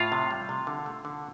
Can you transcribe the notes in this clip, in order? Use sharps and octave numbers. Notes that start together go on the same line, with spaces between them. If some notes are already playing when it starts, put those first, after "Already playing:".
Already playing: A2 F4 F5
C3
G3
C3
D3
A3
D3